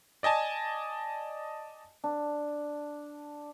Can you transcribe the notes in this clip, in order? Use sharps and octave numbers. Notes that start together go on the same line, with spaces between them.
D5 D#5 G#5 A5
D4